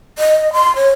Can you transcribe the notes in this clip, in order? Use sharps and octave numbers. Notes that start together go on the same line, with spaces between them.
D#5
C6
C#5